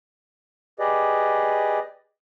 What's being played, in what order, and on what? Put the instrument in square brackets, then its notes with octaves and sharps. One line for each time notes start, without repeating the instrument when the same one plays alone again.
[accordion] G4 G#4 B4 D5 D#5